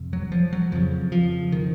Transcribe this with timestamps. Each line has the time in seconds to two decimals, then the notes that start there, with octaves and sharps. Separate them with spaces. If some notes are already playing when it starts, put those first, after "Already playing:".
Already playing: F2 C3
0.13 F#3
0.32 F3
0.53 F#3
0.72 F2 C#3 F3
1.12 F3
1.52 D#3